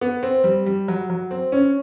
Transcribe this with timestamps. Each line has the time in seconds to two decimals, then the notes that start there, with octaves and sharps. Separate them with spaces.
0.01 B3
0.23 C4
0.44 G3
0.66 G3
0.88 F#3
1.10 F#3
1.31 C4
1.52 C#4